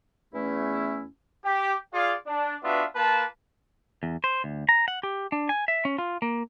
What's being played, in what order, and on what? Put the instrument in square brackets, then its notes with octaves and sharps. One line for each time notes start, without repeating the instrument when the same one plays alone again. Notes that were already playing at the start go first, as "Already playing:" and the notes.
[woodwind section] E2 A3 C#4 E4
[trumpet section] G4
F4 G#4 D5 F5
D4
B3 D4 F4 F#4 B4 E5
A#3 F4 B4 A5
[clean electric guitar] E2
C5
D2
A#5
F#5
G4
D4
G#5
E5
C#4
F4
A#3